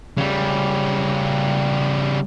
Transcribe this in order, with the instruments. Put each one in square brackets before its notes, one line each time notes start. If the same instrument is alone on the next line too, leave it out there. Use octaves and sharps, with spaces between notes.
[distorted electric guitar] C#3 G3